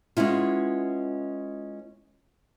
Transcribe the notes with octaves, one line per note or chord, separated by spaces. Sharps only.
G#3 B3 C#4 E4 F4